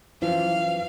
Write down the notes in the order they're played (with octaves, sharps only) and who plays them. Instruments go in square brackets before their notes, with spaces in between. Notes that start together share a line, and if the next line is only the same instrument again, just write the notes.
[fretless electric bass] F#2 E3 F3 [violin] F5